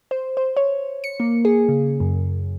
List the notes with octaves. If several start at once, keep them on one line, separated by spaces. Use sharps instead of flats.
C5
C5
C#5
C#7
A#3
G#4
C#3
F#2